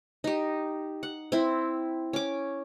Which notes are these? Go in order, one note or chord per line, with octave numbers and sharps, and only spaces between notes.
D#4 G4
F#5
C4 E4
C#4 D6